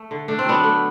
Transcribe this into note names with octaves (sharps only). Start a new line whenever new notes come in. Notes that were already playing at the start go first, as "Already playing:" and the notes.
Already playing: A3
D3
A3 D4
C4
F#3 B3 D4
A3